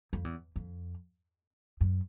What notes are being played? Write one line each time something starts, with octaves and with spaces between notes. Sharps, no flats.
F2
E2
F2
F#2